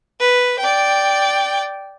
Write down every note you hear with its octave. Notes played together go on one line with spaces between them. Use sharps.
B4
D5 G5